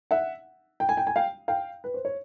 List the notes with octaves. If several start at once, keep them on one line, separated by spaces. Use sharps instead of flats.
E5 F#5
G5
G#5
G5
G#5
F5 G5
F5 G5
B4
C5
C#5